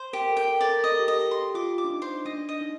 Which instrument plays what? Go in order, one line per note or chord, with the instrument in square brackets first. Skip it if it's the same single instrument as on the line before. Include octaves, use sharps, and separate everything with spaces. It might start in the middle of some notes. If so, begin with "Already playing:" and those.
Already playing: [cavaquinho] C5
[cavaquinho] G4 [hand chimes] A#4
[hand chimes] A4
[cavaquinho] G5
[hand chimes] A#4
[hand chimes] A4 [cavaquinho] D5
[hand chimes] A#4
[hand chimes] A#4 [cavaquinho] D#5
[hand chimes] A4
G4
[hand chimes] A4 [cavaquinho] D#5
[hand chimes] G4
[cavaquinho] C6
[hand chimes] G4
[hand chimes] F4 [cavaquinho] D6
[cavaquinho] D6
[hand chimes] D4
D#4
[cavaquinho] C5
[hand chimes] D4 [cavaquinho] D#5
[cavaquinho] D#5
[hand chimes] D#4